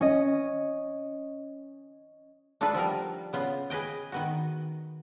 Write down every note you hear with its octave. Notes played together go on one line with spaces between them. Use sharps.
C#4 D#5
D4 D#4 F4 A4 B4
F3 G3 B3 A#4
C#3 B3 F4
G#4 B4 D#5 G5
D#3 B3 F#4